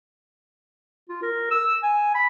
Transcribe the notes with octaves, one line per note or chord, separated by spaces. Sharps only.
F4
A#4
E6
G#5
B5